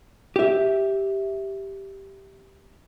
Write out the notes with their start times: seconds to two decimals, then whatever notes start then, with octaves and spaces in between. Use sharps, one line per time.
0.36 G4 E5